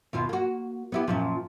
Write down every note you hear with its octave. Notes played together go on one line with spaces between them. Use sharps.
D#2 B2 F4
A#3 F#4
B3 E4 G4
F#2 A#2 F3